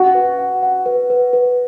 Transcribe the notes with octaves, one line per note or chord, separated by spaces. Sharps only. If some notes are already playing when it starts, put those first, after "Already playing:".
Already playing: F#4 F#5
B4
F#5
F#5
B4
B4
B4